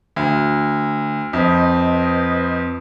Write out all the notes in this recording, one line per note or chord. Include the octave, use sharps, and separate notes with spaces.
D2
F2 B4 C5 D#5